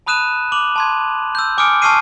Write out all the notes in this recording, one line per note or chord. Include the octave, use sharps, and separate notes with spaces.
A5 B5 D#6 F#6 D#7 E7
D6 F7 F#7
A5 C6 G#6
E6 G6
G#5 D6 D#6 F6 C#7 D7
A5 C#6 E6 F6 C7 D#7